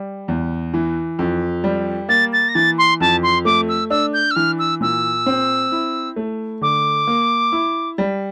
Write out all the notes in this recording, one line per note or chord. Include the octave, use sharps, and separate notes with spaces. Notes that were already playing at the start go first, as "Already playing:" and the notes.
Already playing: G3
E2
E3
F2
G3
A#3 A6
A6
A#6
E3 A6
C6
F2 A5
C6
A3 D6
E6
D4 E6
G6
E6
E3 F6
E6
A#2 E6
C4
E4
A3
D3 D6
A#3
E4
G3